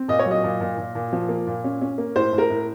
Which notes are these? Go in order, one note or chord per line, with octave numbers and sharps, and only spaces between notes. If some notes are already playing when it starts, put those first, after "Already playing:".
Already playing: C4
A#2 D#5
C#5
F#3 D#5
A#2
A#2
A#2
A#2
F3
A#3
A#2
C#4
C#4
A#3
A2 C5
A2
A#4
A2